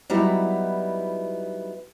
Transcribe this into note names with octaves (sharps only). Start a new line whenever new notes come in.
F#3 G3 B3 D#4 E4